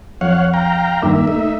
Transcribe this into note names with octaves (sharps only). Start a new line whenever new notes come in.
F2 C#5 F5 F#5
F5 G5 A#5
G2 D#3 A#3 E5 D6
A3 D#4 E5